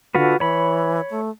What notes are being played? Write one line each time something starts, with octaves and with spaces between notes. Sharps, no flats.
D3 F4 F#4 B4
E3 C#5 B5
A3